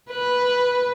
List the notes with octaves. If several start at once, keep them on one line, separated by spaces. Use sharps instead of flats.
B4